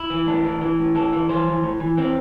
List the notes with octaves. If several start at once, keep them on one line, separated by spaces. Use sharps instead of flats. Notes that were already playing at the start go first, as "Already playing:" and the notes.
Already playing: E4
E3
A2 D4
E3
E3
A2
E3 A4
E3
E3 C5
E3
A2
E3
E3 C4